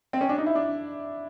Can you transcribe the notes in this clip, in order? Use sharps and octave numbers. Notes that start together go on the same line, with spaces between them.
C4
C#4
D4
D#4
E4
D4